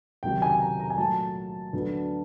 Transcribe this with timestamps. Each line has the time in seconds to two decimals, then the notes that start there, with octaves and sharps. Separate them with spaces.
0.23 C#2 C3 D#3 F#3 G5
0.42 G#5
0.60 A#5
0.80 A#5
0.90 G#5
0.98 A#2 F#3 A3 A5
1.73 D2 D3 F#3 B3